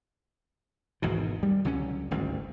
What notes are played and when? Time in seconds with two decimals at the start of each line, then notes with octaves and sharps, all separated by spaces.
1.02 G#1 E2 G#2 B2
1.43 G3
1.65 C#2 D3 F#3 C#4
2.11 G#1 D2 G2